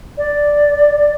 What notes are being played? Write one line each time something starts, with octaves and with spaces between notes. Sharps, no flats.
D5